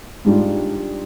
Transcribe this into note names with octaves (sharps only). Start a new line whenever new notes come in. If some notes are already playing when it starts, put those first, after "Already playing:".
G#2 G3 D4 F4